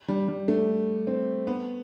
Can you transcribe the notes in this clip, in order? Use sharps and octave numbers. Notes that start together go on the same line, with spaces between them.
G3
G3
A3
C4
B3